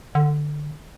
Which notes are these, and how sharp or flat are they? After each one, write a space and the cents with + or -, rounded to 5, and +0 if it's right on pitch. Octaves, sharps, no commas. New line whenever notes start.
D3 +15